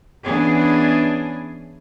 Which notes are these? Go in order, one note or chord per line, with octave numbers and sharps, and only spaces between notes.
E3 B3 C#4 D4 G#4